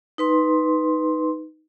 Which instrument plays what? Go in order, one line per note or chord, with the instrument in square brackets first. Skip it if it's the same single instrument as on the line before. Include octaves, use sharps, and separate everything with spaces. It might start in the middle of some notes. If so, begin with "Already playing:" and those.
[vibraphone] D#4 B4 C6